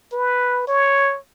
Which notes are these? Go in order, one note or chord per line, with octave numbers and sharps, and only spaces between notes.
B4
C#5